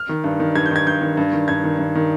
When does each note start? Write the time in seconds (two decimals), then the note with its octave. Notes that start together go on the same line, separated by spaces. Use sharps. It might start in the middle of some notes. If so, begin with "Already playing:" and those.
Already playing: F6
0.09 D#3
0.24 G2
0.40 D#3
0.55 G2 G#6
0.66 G6
0.71 D#3 G#6
0.87 G2 G6
1.01 D#3
1.17 G2
1.33 D#3
1.48 G2 G#6
1.64 D#3
1.79 G2
1.95 D#3